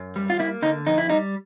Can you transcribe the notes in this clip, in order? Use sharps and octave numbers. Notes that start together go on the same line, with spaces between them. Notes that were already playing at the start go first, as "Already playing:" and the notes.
Already playing: F#2
G3
F4
A#3 E4
D3 D#4
F2 D#4
E4
G3 D#4